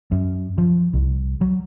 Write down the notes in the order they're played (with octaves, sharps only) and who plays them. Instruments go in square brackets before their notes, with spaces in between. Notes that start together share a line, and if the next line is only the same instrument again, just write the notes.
[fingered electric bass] F#2
F3
C2
F#3